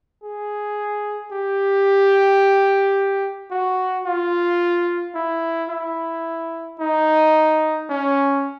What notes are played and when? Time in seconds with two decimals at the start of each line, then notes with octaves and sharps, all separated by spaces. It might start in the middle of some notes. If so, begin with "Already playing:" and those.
0.24 G#4
1.32 G4
3.51 F#4
4.06 F4
5.15 E4
5.70 E4
6.80 D#4
7.90 C#4